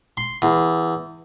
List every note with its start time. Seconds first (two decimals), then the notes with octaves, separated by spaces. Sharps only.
0.17 C6
0.42 E2